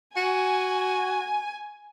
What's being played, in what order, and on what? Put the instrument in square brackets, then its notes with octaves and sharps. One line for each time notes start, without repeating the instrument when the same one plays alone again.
[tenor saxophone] F#4 [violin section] G#5